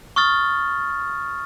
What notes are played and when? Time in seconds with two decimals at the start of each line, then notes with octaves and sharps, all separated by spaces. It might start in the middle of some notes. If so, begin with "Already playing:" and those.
0.16 C#6 D#6 F6 A6